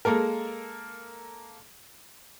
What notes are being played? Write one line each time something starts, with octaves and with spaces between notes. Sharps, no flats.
G#3 A#3 A4 A#4